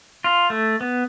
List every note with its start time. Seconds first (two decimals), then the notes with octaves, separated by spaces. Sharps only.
0.24 F4
0.50 A3
0.81 B3